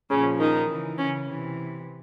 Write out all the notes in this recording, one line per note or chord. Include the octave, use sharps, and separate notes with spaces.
A#2 C#3 F3 C#4
D#3 D#4
C#3 E3
C#3 C#4
C3 E3